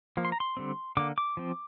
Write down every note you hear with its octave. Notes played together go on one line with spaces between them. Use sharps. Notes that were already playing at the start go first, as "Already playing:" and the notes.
F3 A#3
C6
A#5
C6
D3 G3 C4
D3 A#3 D6
D6
F3 C4